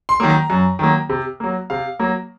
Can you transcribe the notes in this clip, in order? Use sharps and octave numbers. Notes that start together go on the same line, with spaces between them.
C6
D#3 F#3 A#3
A#5
F#2
D#3 F#3 A#3
C3
F#3 A#3
C3 F5
F#3 A#3